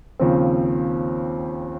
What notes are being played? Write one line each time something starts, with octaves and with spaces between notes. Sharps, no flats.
D#2 C#3 F3 C4